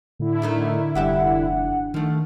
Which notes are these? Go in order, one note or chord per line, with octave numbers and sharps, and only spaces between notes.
A2 D3 E4
D#3 A3 D#4
F1 G2 G4 E5 F#5
D#3 F3 A3